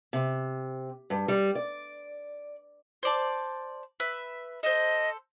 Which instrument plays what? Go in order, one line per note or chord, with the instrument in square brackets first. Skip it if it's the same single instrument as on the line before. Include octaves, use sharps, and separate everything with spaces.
[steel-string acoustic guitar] C3
G2
G3
D5
[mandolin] C5 D5 A5
B4 E5
[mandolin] A4 C5 [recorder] D#5